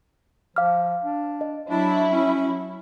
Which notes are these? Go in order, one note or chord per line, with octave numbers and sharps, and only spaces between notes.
F3 F5 D6 F6
D4
D#5
F#3 D4 E4
C#4